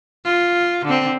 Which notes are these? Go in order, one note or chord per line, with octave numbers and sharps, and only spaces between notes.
F4
D3 C4